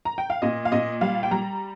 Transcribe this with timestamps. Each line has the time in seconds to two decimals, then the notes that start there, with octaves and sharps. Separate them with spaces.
0.05 A#5
0.18 G5
0.30 F5
0.42 A#2 D#5
0.65 F5
0.72 A#2 D#5
1.01 G3 F5
1.23 G5
1.31 G3 A#5